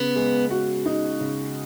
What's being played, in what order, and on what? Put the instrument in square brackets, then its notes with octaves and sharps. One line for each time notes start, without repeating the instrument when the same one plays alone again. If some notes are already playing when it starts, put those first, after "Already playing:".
Already playing: [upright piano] C#3 [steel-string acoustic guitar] B3
[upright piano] G#3
F#4
D#4
C#3